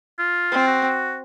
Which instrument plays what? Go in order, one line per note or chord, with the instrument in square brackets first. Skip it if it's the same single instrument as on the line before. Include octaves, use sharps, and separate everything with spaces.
[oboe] F4
[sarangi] C4
[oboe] F#4